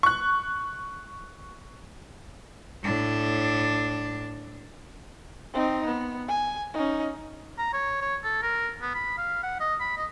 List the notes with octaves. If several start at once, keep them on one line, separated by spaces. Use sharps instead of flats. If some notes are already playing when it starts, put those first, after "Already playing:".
C#6 F#6
A2 D4
C4 D#4
B3
G#5
C#4 D#4
A#5
C#5
C#5
A4
A#4
B3
B5
F5
F#5
D#5
B5
D#5